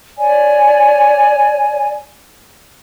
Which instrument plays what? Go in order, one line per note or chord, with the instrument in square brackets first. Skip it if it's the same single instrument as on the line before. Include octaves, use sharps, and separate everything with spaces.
[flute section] C#5 D5 G#5